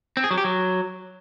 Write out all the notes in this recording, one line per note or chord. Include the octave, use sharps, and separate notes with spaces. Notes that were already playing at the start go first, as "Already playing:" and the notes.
C4
G#4
F#3
G4
F#3